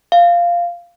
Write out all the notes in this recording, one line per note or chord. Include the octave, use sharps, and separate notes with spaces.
F5